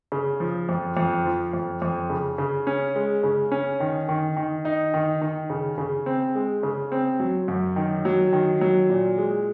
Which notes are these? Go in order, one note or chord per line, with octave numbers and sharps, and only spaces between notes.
C#3
F3
F2
F2
F3
F2
F2
C#3
C#3
C#4
G#3
C#3
C#4
D#3
D#3
D#3
D#4
D#3
D#3
C#3
C#3
C4
G#3
C#3
C4
F#3
F#2
D#3
F#3
D#3
F#3
A#2
G#3